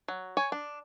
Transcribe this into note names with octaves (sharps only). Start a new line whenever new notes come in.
F#3
C#5 G#5
D4